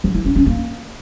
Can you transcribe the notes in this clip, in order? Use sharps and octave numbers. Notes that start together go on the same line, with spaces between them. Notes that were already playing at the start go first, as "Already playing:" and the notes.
F3
E4
C#4
C#4
A#3